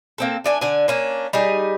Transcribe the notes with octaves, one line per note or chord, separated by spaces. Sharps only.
A#3 C4 A4
A3 D4 G#5
D3 D4 G#5
A#3 C#4 D4
G3 D#4 G#4